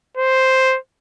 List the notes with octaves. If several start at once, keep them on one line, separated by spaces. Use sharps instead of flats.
C5